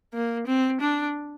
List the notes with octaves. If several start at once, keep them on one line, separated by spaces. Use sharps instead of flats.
A#3
C4
D4